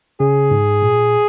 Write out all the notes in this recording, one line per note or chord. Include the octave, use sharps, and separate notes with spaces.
C#3 G#4
G#2
A#2